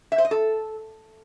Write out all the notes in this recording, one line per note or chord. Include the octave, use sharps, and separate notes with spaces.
E5
C5
D#5
A4